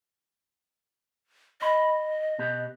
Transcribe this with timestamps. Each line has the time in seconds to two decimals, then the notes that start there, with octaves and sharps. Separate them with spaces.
1.62 D#5 B5
2.39 B2 B3 G4